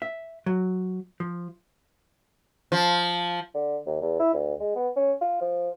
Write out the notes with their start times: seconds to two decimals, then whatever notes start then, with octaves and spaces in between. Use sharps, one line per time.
0.02 E5
0.46 F#3
1.20 F3
2.72 F3
3.54 D3
3.86 D#2
4.02 E2
4.19 E4
4.34 D2
4.60 G#3
4.75 B3
4.96 C#4
5.21 F4
5.41 F3